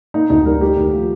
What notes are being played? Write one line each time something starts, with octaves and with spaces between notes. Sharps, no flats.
A#3 D#4
D2 D#4
G3 A#4
A3 G4
D#2
F3